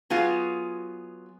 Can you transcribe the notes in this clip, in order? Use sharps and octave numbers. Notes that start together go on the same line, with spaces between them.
F#3 B3 F4 G#4